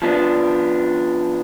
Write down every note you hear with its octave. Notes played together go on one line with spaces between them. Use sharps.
F3 B3 D4